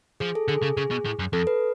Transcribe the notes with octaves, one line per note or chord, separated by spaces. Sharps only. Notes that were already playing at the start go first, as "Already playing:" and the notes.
F3 G#4
A4
D3 G#4
C#3
C#3 G#4
B2
A2
F#2
F2 A4
B4